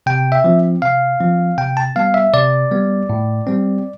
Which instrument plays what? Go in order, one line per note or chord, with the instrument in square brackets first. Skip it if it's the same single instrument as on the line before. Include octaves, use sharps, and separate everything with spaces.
[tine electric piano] C3 G5
E5
F3 C4
C3 F5
F3 C4
C3 G5
A5
G3 B3 F5
E5
C3 D5
G3 B3
A2
G3 C4